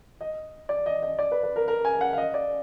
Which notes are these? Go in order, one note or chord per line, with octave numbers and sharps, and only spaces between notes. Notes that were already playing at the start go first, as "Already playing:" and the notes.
D#5
D5
D#5
D#5
D5
B4
B4
A#4
A#4
G#5
F#5
F5
D#5
D5